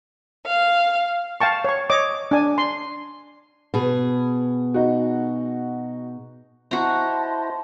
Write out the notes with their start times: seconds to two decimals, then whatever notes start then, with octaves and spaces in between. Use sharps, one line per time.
0.45 F5
1.40 F5 G5 A5 C#6
1.65 C#5 C#6
1.90 C#5 D#5 D6
2.31 D4 G#5
2.58 C6
3.74 B2 G#4
4.74 D#4 F#4
6.71 E4 F#4 C5 D#5 A5 A#5 C6